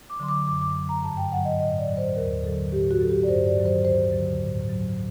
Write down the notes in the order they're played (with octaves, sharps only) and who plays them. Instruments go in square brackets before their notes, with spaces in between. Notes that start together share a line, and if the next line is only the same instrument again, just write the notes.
[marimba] D6
D3 F#3 C6
D6
F#2 D6
D6
D3 F#3
A#5
G2 A5
G5
D3 F#3 F#5
D#5
A2 D#5
D5
F#3
C5
D#2 A#4
D3 F#3 A4
A2 G4
F#4
F#3 A4
G4
D5
G2 C5
D5
D#3 F#3
C5
D2 C5
D3 F#3
A2
F#3